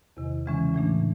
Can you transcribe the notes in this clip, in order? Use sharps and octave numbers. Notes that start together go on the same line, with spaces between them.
E2 C3 D#3
C#3 E3 G#3 C#4
A2 E3 A3 D4